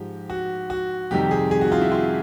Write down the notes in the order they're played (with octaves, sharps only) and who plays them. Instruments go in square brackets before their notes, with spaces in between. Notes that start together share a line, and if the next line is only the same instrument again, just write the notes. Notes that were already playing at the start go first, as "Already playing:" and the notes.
Already playing: [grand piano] G#2 F3 G4
F#4
F#4
F2 C3 D#3 G3 G4
G#4
G#4
F#4
F4
E4
F4